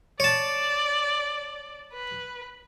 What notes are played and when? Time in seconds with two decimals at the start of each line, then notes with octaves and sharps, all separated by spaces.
0.20 C#5 D5 A5
1.93 B4